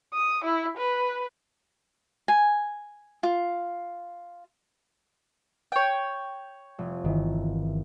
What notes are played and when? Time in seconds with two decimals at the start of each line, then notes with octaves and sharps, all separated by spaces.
0.14 D#6
0.45 E4
0.78 B4
2.28 G#5
3.23 F4
5.72 C#5 G5
6.78 F1
7.04 G1 D#3 E3